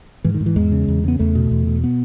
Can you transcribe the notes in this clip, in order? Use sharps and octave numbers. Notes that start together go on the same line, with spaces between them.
G#2 E3
D#3
G#2
E3
E2 G#3
C#3
E2
C#3 B3
E2 A3
B2
E2
B2
B3